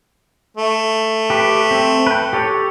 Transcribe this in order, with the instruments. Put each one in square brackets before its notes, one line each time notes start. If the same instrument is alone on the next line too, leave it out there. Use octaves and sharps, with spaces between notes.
[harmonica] A3
[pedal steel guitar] G4 B4
C4
B4 G5
G4 A4 C#5